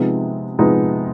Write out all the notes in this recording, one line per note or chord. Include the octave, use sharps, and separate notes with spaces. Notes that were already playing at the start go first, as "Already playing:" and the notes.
Already playing: C3 F3 G#3 B3 D#4
C3 F3 G#3 B3 D#4